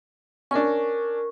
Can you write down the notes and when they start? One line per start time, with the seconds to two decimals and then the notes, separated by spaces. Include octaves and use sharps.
0.51 C#4 D4 A#4 C#6